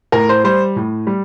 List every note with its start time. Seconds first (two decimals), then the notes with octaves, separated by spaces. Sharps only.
0.12 A2 A#4
0.29 C5
0.44 G3 C5
0.76 A2
1.07 G3